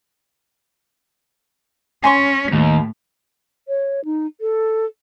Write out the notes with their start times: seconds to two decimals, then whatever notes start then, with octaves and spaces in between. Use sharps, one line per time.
2.04 C#4 G#5 C6 C#6
2.52 D#2 A2
3.68 C#5
4.05 D#4
4.41 A4